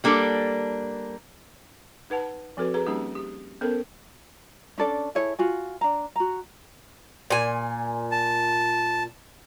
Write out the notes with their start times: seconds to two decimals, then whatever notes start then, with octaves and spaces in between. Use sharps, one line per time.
0.04 G3 A#3 D4 A4
2.10 D#4 B4 F#5 A5
2.57 F3 C4 F#4 A4 B4
2.74 G#4 B4 A#5
2.87 G3 A#3 C#4 D#4 G4
3.15 G4
3.61 B3 C#4 A4 A#4 C5
4.78 C#4 D4 A4 D5
5.15 E4 G#4 A4 C#5
5.39 F4 F#4 G#5
5.81 D4 A#5
6.16 F#4 A#5
7.30 A#2 G#5
8.12 A5